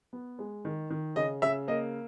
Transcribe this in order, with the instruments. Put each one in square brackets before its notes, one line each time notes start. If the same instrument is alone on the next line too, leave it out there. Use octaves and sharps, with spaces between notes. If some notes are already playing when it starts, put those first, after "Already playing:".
[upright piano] B3
G#3
D#3
D#3
C#3 D#5
C#3 E5
A#3 D#5